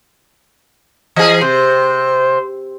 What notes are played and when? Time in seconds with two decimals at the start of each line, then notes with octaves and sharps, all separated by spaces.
1.16 E3 G#4 D#5
1.41 C3 C5